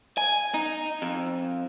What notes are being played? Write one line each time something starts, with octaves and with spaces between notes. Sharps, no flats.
G#5
D#4
F2